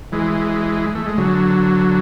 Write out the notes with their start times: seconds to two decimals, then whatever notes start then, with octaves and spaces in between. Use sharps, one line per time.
0.12 E3 G#3
0.95 A3
1.06 G#3
1.18 D3 F#3